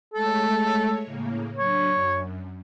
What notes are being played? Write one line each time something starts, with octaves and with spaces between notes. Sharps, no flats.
G#3 A3 A4 C#5
A2 C#3 A#3
F#3 D4 C#5
F#2